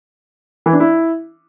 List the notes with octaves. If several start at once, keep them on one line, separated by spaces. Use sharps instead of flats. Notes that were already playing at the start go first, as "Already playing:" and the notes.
E3
D4
E4